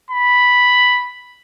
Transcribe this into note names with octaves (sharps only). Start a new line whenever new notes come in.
B5